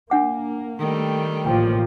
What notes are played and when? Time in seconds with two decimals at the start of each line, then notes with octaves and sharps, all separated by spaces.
0.10 A#3 D4 F#5 D6
0.79 D#3 G3 A3
1.46 A1 F3 A#3 G5